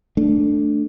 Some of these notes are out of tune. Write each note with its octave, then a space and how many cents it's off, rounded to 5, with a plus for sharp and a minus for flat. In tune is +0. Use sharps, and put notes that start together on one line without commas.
A3 +0 D4 +0